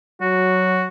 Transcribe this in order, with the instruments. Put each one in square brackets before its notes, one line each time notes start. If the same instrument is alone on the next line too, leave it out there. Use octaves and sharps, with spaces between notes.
[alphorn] F#3 [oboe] F#4